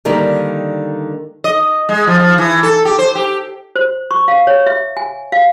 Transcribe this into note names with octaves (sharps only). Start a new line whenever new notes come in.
D3 D#3 G3 A#3 D#4
D#5
G#3
F3
F3
E3
A4
G4
C5
G4
C5
C#6
F5
C#5
E5
G#5
F5